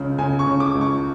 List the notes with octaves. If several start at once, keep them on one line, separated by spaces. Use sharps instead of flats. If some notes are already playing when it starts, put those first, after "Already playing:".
Already playing: C#2 C#3
C#3 G#5
C#6
C#3
D6
C#2
C#6